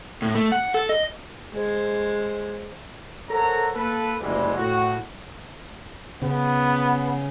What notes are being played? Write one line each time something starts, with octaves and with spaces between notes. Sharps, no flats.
A2
A3
F#5
A4
D#5
G#3 C5
A4 A#4 C5 C#5 F#5 A#5
A#3 A4 B4
F#1 D2 G#2 E3 G3 G#3
A2 F#4
C#3 B3